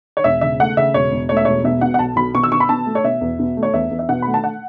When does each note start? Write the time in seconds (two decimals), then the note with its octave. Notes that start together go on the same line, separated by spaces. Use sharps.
0.17 C#5
0.24 E1 E5
0.41 C#3 E5
0.60 A3 F#5
0.77 C#3 E5
0.94 E1 C#5
1.12 E1
1.29 A3 C#5
1.37 E5
1.45 E1 C#5
1.64 B2 E5
1.81 B2 F#5
1.94 F#5
1.99 B1 A5
2.16 B1 B5
2.34 B2 C#6
2.43 E6
2.51 B2 C#6
2.60 B5
2.69 B2 A5
2.86 A3
2.95 C#5
3.04 B2 E5
3.21 E2
3.39 B2
3.57 A3
3.63 C#5
3.73 E2 E5
3.91 E2
3.99 E5
4.09 B2 F#5
4.22 A3 B5
4.34 A5
4.44 F#5